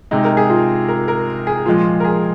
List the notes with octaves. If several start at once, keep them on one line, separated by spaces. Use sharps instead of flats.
C3 G#3 D#4
A#4
G#4
F4
A#4
A#4
G#4
A#2 F3 G#3 F4
A#4
G#4